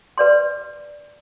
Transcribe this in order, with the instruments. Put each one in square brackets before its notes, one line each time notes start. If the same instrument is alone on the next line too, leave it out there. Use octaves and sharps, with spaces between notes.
[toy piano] B4 D5 C6